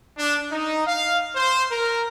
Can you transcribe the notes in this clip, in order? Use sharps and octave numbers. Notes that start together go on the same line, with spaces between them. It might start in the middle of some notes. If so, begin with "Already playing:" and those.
D4
D#4
F5
C5
A#4